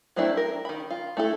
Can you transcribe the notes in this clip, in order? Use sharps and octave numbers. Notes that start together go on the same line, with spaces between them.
F#3 A3 C4 D4 E4
A#4
D#3 B5
F4
A3 E4 A4